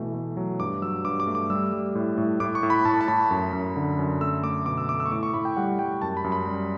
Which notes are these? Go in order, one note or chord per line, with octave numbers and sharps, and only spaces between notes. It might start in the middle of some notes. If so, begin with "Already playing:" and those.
Already playing: B2 E3 A3
A3
F#3
G2 D6
F#3 E6
G2 D6
D6
A3
D6
G3 E6
G3
A2
A2
A2 D6
C#6
A2
B5
A2 A5
A5
A2 B5
F#2
F#2
D3
F#2
A3 E6
A3 D6
B2 D6
E6
A3 D6
E6
C#6
A2 D6
C#6
A2 B5
G5
G3 F#5
G3 G5
F#2 A5
B5
F#2
B5
G3